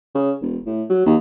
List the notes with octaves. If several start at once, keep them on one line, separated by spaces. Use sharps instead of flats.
C#3
E1
A2
F#3
D#2